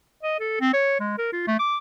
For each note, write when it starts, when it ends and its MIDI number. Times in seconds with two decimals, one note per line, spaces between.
0.23 0.35 75
0.40 0.59 69
0.61 0.71 60
0.73 0.99 73
1.00 1.15 56
1.18 1.30 70
1.32 1.46 65
1.47 1.55 57
1.59 1.77 86